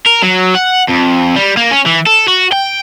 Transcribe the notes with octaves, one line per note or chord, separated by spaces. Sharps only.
A#4
F#3
F#5
F2
G3
A#3
C#4
E3
A4
F#4
G5